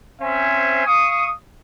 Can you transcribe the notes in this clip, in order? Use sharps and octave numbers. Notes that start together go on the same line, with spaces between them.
C4 C#4 C5 E5 G#5
F5 C#6 D#6